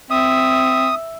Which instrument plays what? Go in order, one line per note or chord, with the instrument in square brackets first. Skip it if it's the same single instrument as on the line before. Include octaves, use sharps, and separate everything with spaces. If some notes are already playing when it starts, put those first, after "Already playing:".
[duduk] C4 [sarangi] E5 [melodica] D#6